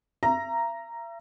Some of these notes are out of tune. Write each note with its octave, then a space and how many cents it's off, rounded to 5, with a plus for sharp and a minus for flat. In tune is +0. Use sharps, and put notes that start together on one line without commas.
E5 +40 A#5 +0